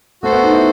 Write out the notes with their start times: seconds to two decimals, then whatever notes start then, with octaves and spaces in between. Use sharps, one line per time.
0.23 A3 F#4 A4 C5
0.32 B3
0.43 D#4
0.53 E4